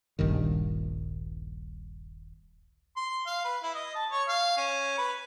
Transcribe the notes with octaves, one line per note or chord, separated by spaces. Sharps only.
D#1 A#1 G2 D#3
C6
F5
B4
E4
D#5
A5
C#5
F5
C#4
B4